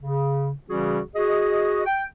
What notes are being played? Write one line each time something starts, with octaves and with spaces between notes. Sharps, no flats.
C#3
C#3 E3 G3 C#4 F#4 G#4
F#4 G#4 D#5
G5